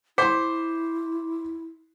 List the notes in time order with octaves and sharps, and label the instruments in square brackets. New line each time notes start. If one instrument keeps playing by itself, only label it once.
[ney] E4 [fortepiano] C5 [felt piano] C6 B6 [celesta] D6